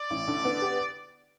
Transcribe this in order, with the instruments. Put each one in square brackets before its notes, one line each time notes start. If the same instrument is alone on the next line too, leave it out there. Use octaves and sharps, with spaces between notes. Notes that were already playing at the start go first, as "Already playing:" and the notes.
Already playing: [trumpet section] D5
[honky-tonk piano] A1
D3
B3
G4